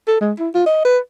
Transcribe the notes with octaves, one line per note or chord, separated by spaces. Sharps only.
A4
G#3
E4
F4
D#5
B4